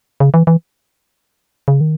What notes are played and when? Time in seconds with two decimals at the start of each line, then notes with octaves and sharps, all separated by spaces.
0.20 C#3
0.34 E3
0.47 E3
1.68 C#3
1.81 D#3